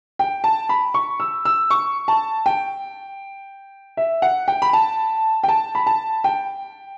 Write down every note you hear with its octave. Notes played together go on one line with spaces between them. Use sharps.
G5
A5
B5
C#6
E6
E6
C#6
A5
G5
E5
F#5
G5
B5
A5
G5
A5
B5
A5
G5